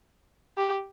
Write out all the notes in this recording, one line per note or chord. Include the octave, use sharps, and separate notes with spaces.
G4